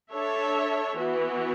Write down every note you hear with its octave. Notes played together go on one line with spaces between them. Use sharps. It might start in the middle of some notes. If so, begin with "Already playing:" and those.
D4 A4 C#5 E5
E3 B3 F#4